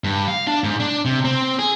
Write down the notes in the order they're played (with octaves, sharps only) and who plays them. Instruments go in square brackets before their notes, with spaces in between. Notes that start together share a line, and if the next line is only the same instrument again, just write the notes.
[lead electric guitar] G2
F5
D4
G#2
D4
C3
C4
G#4